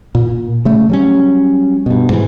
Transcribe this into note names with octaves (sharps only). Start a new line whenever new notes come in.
A#2
C#3 A3
F#3 G3 C#4
G2 B2
G#2 E3